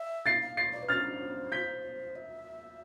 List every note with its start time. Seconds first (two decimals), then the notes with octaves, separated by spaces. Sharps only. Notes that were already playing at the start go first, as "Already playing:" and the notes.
Already playing: E5
0.26 F5 A6 C7
0.41 F5
0.57 A6 C7
0.73 D5
0.83 B4
0.89 C5 F6 A6
1.52 G6 B6
2.16 E5